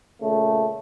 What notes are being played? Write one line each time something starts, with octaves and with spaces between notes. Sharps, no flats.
A#2 C#3 A3